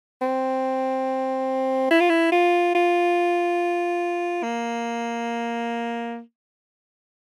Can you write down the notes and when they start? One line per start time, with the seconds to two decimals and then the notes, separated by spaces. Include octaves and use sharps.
0.22 C4
1.91 E4
2.00 F4
2.10 E4
2.32 F4
2.75 F4
4.43 A#3